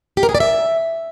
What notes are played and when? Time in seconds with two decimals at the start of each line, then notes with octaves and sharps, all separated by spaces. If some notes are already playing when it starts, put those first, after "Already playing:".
0.17 G4
0.23 A#4
0.29 G#4
0.35 D5
0.40 E5